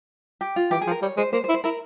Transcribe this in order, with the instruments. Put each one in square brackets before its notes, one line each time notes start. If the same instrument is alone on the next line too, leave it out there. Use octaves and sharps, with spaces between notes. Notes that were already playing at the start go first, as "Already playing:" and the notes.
[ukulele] G4
F4
[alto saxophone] E3 [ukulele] G4
[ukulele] G#4
[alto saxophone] F3
[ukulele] A#4
[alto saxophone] G3 [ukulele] C#5
[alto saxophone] G#3 [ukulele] C5
[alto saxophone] A#3 [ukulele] C5
[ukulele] C5
[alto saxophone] E4
[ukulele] C5
[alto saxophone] E4 [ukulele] A#4